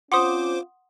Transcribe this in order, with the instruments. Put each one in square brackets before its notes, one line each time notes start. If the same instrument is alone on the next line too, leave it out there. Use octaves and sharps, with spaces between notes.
[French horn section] C4 C#4 F4 [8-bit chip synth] C5 D6 [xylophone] F#5 C6 D#6